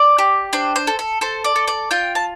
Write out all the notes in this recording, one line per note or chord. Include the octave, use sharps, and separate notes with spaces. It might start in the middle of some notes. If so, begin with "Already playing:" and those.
Already playing: D5
G4
D4 C5
C5
A4
A4
A4 C5
D5
A4
D5
F4 G5
A5